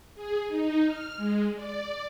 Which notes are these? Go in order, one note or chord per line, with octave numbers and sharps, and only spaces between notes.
G#4
D#4
F6
G#3
D5